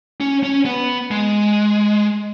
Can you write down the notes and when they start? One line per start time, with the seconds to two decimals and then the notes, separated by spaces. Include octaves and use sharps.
0.21 C#4
0.43 C#4
0.66 B3
1.11 G#3